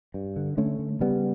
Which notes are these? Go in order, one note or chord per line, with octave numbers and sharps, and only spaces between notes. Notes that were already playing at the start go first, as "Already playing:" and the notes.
G2
D3
D3 A3 C#4
D3
C#3 G3 B3